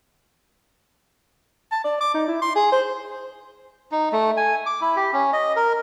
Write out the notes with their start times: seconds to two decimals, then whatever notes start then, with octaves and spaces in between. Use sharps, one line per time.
1.72 A5
1.85 D5
2.01 D6
2.14 D#4
2.28 E4
2.42 C6
2.56 G#4
2.72 C5
3.92 D#4
4.12 A3
4.37 G#5
4.66 D6
4.81 E4
4.96 G4
5.13 C#4
5.33 D#5
5.56 A#4